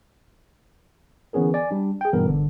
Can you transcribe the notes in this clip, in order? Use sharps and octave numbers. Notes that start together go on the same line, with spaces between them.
D3 E3 B3 C#4 G#4 A#4
D5 G#5
G3 D4
G#4 G5
G2 B2 E3 B3 A#4
G1 D3